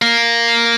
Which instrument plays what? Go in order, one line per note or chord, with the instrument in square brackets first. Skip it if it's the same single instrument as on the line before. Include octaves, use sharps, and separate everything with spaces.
[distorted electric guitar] A#3